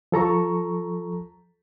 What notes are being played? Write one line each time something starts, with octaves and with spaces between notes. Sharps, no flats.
F3 A4 A#5 C#6